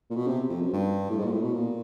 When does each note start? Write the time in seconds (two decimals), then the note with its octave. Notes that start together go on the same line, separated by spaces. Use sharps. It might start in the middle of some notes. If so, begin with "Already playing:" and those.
0.10 A#2
0.16 B2
0.27 C3
0.50 F2
0.62 F#2
0.73 G2
1.10 A2
1.19 G#2
1.25 A#2
1.30 A2
1.42 B2
1.53 A#2